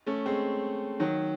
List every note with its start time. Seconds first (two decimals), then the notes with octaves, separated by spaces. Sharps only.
0.07 A3 C#4
0.26 G#3 C4
1.00 D#3 F#3